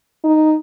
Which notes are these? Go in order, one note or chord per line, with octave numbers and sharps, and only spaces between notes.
D#4